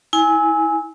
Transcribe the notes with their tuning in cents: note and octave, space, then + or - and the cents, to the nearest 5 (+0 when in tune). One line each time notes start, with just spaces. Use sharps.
E4 -25 G#5 +0